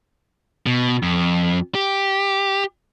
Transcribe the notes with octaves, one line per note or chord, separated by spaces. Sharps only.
B2
F2
G4